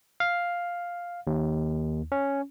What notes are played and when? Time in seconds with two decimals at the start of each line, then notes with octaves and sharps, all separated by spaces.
0.20 F5
1.27 D#2
2.12 C#4